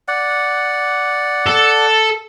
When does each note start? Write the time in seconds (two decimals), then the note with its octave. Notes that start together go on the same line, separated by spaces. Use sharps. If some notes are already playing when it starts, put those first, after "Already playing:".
0.08 D5 F#5
1.47 A4